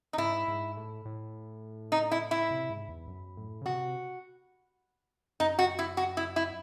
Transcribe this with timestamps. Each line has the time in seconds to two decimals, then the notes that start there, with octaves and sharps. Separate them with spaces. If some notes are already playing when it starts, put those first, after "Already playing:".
0.13 D#4
0.18 G#2 E4
0.48 G#2
0.77 A2
1.05 A2
1.92 D#4
2.12 E4
2.31 E4
2.51 C3
2.70 G#2
2.89 E2
3.07 F#2
3.37 A2
3.61 C#3
3.65 C3 F#4
5.40 F#2 D#4
5.59 F#4
5.79 E4
5.97 F#4
6.17 E4
6.36 E4